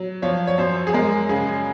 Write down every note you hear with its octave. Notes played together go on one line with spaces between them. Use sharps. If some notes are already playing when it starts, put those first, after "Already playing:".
Already playing: F#3
F3 C#5
C#5
F#2 C5
G#4
G#3 A#4
C#3 G#4